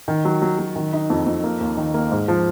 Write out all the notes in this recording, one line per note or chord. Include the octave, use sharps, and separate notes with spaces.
D#3
F#3
F#3
F#3
D#3
D#4
F2
F2
A#3
D#2
D#3
A#3
G#2
F3